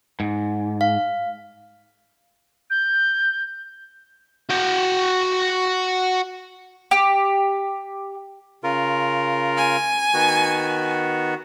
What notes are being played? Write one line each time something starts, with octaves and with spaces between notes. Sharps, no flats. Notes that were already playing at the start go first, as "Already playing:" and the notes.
G#2
F5
G6
F#4 G5
G4
C#3 F4 A#4
G#5
D#3 B3 F#4